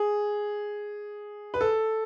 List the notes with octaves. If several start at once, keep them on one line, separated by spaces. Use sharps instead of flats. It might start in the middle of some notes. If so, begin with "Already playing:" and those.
Already playing: G#4
B4
A4